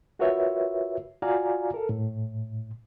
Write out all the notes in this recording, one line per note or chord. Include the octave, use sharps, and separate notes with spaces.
F4 F#4 A#4 B4 C#5 E5
F4 F#4 D5 F5 G#5 A#5
A4 A#4
A2